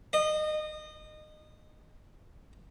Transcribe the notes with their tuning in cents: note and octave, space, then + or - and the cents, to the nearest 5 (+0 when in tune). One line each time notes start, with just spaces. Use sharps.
D#5 -25